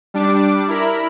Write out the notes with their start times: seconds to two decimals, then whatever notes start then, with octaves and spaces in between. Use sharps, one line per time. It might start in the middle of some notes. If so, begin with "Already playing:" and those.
0.14 G3 D4 D6
0.68 E4 A#4 B5